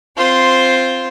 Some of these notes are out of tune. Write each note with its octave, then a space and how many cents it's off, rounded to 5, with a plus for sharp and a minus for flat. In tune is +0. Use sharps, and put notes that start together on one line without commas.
C4 +0 F4 +0 C5 +0